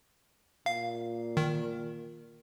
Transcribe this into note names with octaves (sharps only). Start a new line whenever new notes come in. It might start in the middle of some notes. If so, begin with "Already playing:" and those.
A#2 F5
D#3